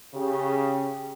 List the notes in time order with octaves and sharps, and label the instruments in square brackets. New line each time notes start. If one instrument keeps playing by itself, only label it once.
[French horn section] C#3 G4